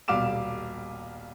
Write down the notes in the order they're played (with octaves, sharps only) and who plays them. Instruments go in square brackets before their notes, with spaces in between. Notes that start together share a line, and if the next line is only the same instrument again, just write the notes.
[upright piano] D#1 B1 G3 F5 D6 E7